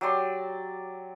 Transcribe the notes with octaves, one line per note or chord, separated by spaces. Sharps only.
F#3 G4 D5 C6